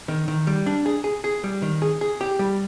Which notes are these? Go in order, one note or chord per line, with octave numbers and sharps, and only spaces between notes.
D#3
D#3
G3
D4
G#4
G#4
G#4
G3
D#3
G#4
G#4
G4
G3